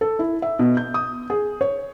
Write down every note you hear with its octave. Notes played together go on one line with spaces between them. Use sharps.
A4
E4
E5
B2
G6
D#6
G#4
C#5